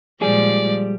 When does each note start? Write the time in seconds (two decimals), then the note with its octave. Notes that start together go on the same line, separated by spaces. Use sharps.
0.22 A#2 F3 G3 G#3 G#4 D5